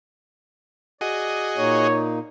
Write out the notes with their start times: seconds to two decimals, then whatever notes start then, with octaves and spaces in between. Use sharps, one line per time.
1.01 F#4 G#4 D5 D#5
1.57 A#2 A#3 D#4 C#5